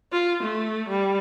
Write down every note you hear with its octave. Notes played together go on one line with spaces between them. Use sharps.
F4
A3
G3